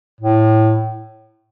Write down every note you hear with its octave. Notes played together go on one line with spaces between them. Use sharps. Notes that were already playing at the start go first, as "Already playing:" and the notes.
A2